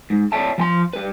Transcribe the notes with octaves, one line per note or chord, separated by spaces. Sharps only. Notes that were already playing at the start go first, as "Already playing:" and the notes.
G#2
C#5 D5 E5 A5
F3 G#5 C6
G3 B4